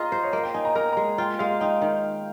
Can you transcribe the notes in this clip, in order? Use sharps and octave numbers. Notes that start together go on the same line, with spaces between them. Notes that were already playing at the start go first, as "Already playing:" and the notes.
Already playing: F4 G#4 D#5 A#5
C5
C#5
A#3 D#5
G5
D#4 G#5
A#5
A#4 A#5
G#3 A#5
F4 G5
G#3 F5
D#4 G5
D#3